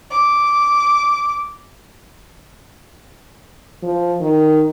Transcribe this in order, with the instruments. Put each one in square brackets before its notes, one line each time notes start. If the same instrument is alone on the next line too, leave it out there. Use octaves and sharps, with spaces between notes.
[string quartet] D6
[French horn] F3
D#3